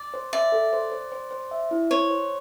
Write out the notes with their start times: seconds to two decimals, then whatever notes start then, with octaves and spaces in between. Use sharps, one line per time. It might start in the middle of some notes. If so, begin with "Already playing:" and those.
Already playing: D5
0.14 C5
0.33 D5 E5
0.52 A4
0.73 C5
0.92 C5
1.12 C5
1.31 C5
1.51 E5
1.71 E4
1.90 C5 C#5
2.11 C5